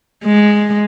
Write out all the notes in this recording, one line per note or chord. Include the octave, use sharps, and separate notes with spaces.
G#3